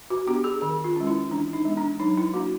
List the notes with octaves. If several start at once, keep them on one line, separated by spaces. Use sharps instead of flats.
F#4
B3 D4 G4
G#4
D#3 G#4
F4
G#3 C#4
E4
E3 D4
D#4
G#3 B3 D4
D4
F#3 D#4
E4
A#3 D4 F#4